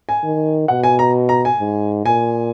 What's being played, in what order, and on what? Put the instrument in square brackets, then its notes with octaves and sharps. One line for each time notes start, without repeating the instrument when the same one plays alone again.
[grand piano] G#5
[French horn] D#3
[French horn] B2 [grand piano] F#5
[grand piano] G#5
A#5
A#5
G#5
[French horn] G#2
[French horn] A#2 [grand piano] G#5